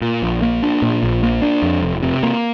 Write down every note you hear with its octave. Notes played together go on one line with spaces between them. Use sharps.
A#2
A#1
A#3
D4
A#2
A#1
A#3
D4
F2
F1
C3
A#3